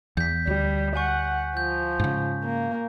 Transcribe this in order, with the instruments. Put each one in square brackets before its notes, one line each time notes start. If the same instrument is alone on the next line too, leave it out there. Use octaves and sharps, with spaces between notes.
[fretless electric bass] E2 [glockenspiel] G6 B6
[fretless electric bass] D2 [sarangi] G3
[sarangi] F#5 [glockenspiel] G#5 C#6 G6
[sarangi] F3 [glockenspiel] G6
[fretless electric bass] G#2 C#3
[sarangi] A#3